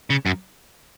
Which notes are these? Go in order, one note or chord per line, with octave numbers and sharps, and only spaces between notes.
C#3
F#2